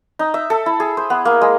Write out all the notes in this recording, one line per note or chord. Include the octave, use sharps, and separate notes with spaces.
D#4
E5
A4
E4
G#4
C5
B3
A#3
G#3